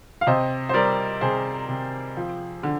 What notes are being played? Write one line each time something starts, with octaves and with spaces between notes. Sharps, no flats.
F5
C3 C5 D#5
C5
G3 A#4 D5
C3 G#4 C5
C3
F3
D3